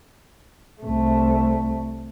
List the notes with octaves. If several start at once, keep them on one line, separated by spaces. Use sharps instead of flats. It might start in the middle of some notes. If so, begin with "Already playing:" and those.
C2 A3